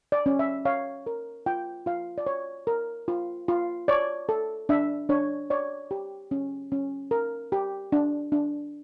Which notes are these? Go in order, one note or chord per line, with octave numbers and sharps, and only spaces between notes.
D5
C#4
E5
C#5 F5
A#4
F4 G5
F4 F5
D5
C#5
A#4
F4
F4
C#5 D5
A4
D4 E5
D4 C#5
C#5 D5
G4
C#4
C#4
A#4
G4
D4
D4